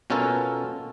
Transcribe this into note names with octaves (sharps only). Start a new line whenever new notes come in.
B2 C#4 F4 A4 A#4